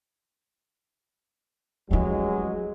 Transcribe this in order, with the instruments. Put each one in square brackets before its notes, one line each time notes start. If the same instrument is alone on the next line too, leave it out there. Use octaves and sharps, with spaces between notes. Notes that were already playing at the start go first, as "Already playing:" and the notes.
[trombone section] A1 F#3 G#3 [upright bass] F3 E4